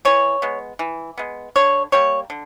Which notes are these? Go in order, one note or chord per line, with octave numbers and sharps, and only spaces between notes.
E3 C#5
G#3 B3
E3
G#3 B3
D3 C#5
G3 A#3 C#5
D3